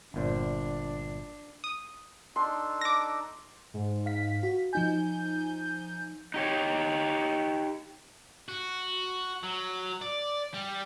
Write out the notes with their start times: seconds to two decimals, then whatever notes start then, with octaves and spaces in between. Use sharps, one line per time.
0.14 G1 A#2 D4 C5
1.64 D#6
2.36 D4 D#4 A4 C6
2.81 D6 A#6
3.74 G#2
4.06 F5 B6
4.43 F#4
4.73 F3 D#4 G#5 G6
6.34 D#4 G4 C#5
8.49 F#4
9.43 F#3
10.01 D5
10.54 G3